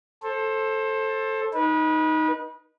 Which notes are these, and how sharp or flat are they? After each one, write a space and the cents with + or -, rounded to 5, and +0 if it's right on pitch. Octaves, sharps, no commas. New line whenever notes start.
A4 +0 C5 +25
D#4 +0 B4 -30